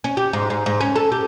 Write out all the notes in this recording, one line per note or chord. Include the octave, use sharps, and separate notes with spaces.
C#4
G4
G#2
G#2
G#2
C#4
A4
G4